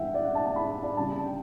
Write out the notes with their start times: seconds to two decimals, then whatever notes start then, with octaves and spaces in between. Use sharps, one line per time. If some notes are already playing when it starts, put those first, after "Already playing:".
Already playing: G2 E3 B3 E5 F#5 G5
0.14 D5
0.24 F#5
0.35 A5
0.46 A5
0.56 B5
0.69 E5
0.83 D5
0.97 C#3 G3 C#4 A5
1.11 A5
1.25 G5